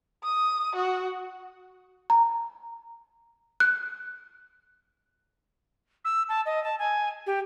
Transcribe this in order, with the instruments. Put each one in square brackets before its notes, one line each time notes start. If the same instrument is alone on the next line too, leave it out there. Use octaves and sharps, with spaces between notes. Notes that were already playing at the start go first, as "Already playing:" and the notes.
[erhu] D#6
F#4
[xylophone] A#5
F#6
[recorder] E6
A5
D#5
A5
G#5
G4